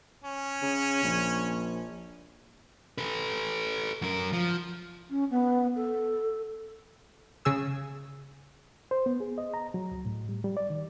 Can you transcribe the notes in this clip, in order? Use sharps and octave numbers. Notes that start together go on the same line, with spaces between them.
C#4
C#3
A#1
A4 B4
F#2 A#4
F3
C#4
B3
A4
C#3 G#4 E6
C5
B3
G#4
D#5
A#5
F#3
C#2
A2
G3
G3
D5
D#3